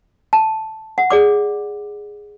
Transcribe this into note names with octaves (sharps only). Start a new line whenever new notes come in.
A5
F#5
G#4 D5 D6